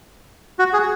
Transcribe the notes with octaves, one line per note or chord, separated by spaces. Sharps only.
F#4
G#4